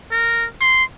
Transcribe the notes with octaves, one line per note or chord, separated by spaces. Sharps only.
A#4
C6